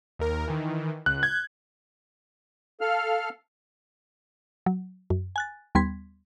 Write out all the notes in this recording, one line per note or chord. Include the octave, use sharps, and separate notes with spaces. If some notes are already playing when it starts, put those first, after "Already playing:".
D#2 A#4
D#3 E3
C#2 F#6
G6 G#6
A4 F5 F6
F#3
F#2
G#5 F#6 A6
D#2 G3 B3 C6 G#6 B6